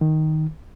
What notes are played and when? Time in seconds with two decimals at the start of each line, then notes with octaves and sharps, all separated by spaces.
0.01 D#3